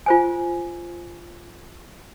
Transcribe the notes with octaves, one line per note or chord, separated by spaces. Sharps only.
F4 C5 G#5